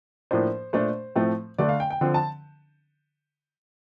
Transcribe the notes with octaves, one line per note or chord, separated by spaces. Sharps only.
A2 F3 A#3 D4 C5
A#2 A3 D4 C5
A2 F3 A3 C4
D3 A3 D4 D5
F5
G5
G5
D3 F3 C4
A5